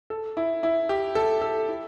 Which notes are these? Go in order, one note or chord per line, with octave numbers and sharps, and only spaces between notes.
A4
E4
E4
G4
A4
A4
E4